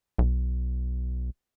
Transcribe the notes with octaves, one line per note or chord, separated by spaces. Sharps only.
B1